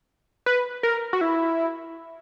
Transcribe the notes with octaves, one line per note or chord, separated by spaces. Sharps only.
B4
A#4
F#4
E4